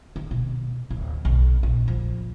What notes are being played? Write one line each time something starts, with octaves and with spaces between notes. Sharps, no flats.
D#3
B2
D1
B1
A#1
F3